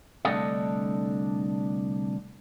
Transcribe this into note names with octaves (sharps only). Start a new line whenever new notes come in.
C2 D3 A3 D4 A4 D#5